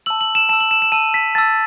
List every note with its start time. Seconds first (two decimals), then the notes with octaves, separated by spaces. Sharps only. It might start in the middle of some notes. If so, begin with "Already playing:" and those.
0.06 A5 E6 F#7
0.21 F#7
0.35 E7
0.49 A5 E6 E7
0.60 F#7
0.71 E7
0.82 E7
0.92 A5 E6 D#7
1.14 B6
1.35 A5 E6 A6